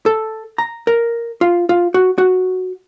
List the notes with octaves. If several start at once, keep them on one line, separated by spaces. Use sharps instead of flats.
A4
A#5
A#4
F4
F4
F#4
F#4